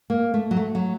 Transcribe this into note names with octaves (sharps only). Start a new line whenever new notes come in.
A#3
A3
F#3
A3
F#3